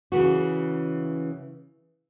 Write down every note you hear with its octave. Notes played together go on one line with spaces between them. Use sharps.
C#3 E3 F#4